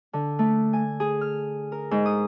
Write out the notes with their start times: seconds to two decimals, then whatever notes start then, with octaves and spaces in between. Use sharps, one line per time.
0.13 D3
0.39 A3
0.73 G#5
1.00 G#4
1.21 F6
1.72 A#4
1.91 G#2
2.06 D#6